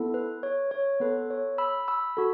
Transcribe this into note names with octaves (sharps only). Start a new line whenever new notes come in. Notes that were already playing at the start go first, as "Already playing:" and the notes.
Already playing: B3 E4 A4
B4
C#5
C#5
B3 A4 B4
C#5
B5 E6
B5 E6
F#4 A4